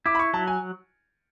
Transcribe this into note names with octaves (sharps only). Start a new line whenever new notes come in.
E4 D6
B5
C#6
F#3 A5
G#5